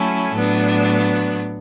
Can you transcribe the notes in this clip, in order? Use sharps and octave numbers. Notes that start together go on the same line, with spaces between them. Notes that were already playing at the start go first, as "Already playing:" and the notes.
Already playing: F#3 A3 C#4 E4 A4
A2 F#3 B3 D4